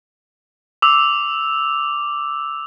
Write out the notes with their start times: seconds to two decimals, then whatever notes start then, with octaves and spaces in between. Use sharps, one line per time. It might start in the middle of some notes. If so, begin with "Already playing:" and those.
0.82 D6 E6 F7